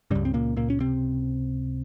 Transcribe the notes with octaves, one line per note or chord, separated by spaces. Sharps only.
C#2 G2 C#3 G3
C4
A#2 A#3
A#2 A#3
C#4
C3 C4